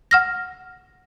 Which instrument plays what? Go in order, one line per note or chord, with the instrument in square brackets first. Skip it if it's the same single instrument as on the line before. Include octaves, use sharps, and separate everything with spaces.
[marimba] F#5 F6 A#6